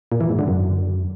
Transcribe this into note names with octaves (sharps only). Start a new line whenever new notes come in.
A#2
E3
G#2
D3
F#2